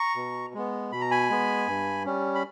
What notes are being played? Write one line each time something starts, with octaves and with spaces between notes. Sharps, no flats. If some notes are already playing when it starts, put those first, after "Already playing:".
Already playing: A#5 C#6
B2
G#3 B3
B2 B5
A#5
G#5 B5
G#3 B3
G2
G3 C#4
B5